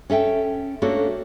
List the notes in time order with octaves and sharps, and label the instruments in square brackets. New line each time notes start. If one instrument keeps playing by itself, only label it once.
[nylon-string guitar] C#4 A4 E5 G5
A3 A#3 C#4 D4 F#4 A4